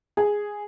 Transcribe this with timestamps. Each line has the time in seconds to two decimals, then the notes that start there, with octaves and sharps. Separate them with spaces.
0.17 G#4